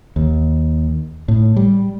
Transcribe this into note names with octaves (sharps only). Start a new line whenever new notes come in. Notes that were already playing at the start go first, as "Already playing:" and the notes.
D#2
A2
G3